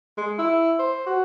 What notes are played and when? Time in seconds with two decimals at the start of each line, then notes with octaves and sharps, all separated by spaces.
0.18 G#3
0.38 E4
0.79 C5
1.06 F#4